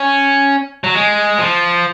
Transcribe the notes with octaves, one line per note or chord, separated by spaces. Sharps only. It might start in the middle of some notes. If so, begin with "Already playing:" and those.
Already playing: C#4
F#3
G#3
F3